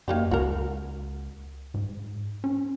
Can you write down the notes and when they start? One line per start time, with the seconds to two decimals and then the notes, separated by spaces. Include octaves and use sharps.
0.08 F#2 A#3 D#4 G4
0.31 C#2 F#4 A#4
1.74 G#2
2.44 C#4